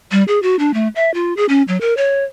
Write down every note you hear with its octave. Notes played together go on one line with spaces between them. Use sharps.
G3
G#4
F#4
D4
A3
E5
F4
G#4
C#4
F#3
A#4
C#5